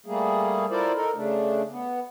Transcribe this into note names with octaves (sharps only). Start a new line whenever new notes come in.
G3 A3 A#3 G#4
E4 F4 A4 A#4 C5 D5
D#4 A4 A#4
C#3 A3 D4
B3